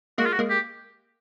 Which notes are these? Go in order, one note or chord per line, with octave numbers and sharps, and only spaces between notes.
G#3 A#3 F#4
F4
F#4
G#3 A#3
G4